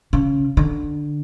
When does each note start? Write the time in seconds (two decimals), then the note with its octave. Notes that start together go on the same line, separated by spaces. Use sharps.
0.13 C#3
0.57 D3